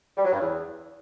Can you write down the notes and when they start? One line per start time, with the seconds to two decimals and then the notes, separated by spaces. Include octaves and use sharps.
0.17 G3
0.25 F#3
0.33 G2
0.40 E2